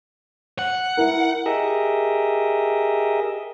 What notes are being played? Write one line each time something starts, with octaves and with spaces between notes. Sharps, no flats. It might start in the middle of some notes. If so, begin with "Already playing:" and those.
F#5
E4 A#4
G4 G#4 A#4 D#5 E5